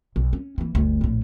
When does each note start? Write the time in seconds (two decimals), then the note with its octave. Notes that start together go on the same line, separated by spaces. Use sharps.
0.16 B1
0.33 C#4
0.58 E3 A#3
0.75 G1 D2
1.01 A#1 A2